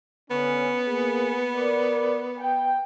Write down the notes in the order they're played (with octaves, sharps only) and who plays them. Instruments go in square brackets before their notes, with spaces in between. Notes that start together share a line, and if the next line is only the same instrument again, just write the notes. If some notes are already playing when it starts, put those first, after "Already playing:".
[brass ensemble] D3 C#4 [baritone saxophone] B3
[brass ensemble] A#3 G#4
A#4 D5
G5